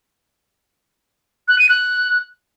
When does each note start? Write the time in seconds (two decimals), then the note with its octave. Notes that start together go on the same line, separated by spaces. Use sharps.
1.48 F#6
1.59 D#7
1.69 F#6